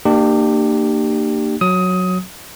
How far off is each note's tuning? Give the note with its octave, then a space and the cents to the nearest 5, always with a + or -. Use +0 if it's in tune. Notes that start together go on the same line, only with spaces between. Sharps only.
A#3 -30 D4 +40 G4 -5
F#3 -10 D#6 +20